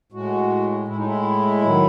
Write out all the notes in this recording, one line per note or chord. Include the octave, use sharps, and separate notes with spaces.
A2 G#3 F#4
A2 G#3 E4
D#4
E4
D#3 F#3